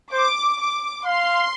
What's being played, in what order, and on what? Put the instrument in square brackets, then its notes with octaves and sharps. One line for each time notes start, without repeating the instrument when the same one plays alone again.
[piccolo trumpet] C5 [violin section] D6
[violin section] D6
[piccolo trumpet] F5 [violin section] C6